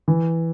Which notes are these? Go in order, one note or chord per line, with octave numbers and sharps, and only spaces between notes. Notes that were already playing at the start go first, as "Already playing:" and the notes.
E3